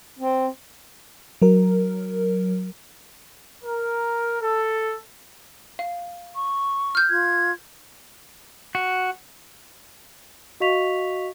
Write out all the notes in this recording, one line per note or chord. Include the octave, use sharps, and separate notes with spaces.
C4
F#3 A#4
A#4
A4
F5
C#6
F6 G6
F4 G#6
F#4
F#4 D#5 F5 C#6 B6 F7